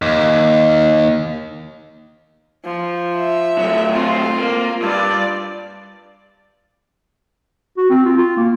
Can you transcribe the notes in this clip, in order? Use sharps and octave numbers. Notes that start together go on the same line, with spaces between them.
D#2
F3
E5
F#3 A3
C4 F4
A#3
G2 F4 D5
F#4
C4
F4
F4
A#3